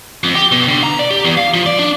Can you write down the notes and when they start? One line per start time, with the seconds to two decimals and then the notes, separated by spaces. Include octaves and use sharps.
0.23 F2
0.35 G4
0.51 B2
0.68 D3
0.83 A#5
0.99 D5
1.11 G4
1.25 E2
1.37 F5
1.54 F3
1.66 D5
1.79 D4